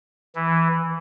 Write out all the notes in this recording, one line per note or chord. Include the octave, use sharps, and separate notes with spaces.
E3